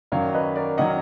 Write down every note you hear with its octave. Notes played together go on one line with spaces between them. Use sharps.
F#2 D#3 F#3 D5 F5
B4 D#5
A#4 D5
D#3 F#3 D#5 F#5